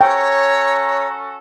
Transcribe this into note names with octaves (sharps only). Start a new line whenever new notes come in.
C#4 F#4 A4 C#5 G5 A#5